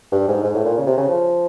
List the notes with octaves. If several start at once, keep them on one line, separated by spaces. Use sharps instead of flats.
G2
G#2
G#2
A2
A#2
C#3
C3
C#3
F3